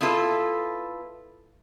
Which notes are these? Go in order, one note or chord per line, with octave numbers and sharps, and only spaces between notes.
B3 E4 F4 A4 B4